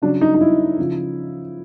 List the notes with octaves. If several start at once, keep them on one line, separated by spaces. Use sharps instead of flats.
C#3 F#3 D4
D#4
D#4
E4
C#3 F3